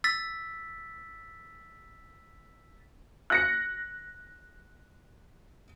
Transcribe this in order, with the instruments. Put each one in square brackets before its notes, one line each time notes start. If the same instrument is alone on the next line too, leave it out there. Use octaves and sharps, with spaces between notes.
[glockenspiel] E6 A6 B6
[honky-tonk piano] F#6 A#6 C#7